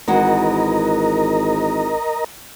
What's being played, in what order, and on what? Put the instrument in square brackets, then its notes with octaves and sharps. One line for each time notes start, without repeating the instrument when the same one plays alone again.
[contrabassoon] G#1 [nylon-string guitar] E3 G#3 F#4 [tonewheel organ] A#4 D#5 A#5